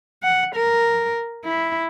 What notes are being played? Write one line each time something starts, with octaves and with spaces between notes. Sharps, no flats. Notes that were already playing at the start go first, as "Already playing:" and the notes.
F#5
A#4
E4